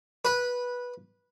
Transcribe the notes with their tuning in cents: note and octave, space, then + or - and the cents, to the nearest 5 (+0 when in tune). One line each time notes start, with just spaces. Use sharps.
B4 -10